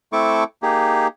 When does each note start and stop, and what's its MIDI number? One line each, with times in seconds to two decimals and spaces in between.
0.13 0.44 57
0.13 0.44 60
0.13 0.44 64
0.13 0.44 69
0.13 0.44 85
0.13 0.44 86
0.63 1.08 58
0.63 1.08 63
0.63 1.08 67
0.63 1.08 68